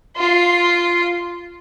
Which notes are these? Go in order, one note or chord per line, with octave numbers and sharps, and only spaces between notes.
F4 C6